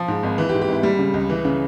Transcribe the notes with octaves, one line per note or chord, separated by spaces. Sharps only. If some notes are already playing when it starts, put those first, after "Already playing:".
Already playing: F3
G#2
G#1
E3
G4
G#2
G4
G#1 E4
G3
C#3
C#2
E3
C#3